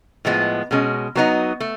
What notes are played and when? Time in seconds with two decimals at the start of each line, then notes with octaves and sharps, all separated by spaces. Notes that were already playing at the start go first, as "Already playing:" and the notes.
0.25 A2 F3 G#3 B3
0.71 B2 G#3 C#4
1.15 F#3 B3 D#4 F#4
1.60 A3